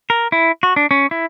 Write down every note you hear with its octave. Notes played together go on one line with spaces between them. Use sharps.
A#4
E4
F#4
D4
C#4
E4